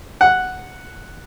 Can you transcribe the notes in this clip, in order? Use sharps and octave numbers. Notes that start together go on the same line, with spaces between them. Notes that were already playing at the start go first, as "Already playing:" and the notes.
F#5